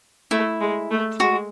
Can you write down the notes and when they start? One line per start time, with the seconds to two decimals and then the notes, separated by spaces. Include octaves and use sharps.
0.31 A3 E4
0.61 G#3
0.91 A3
1.20 G#3 F#4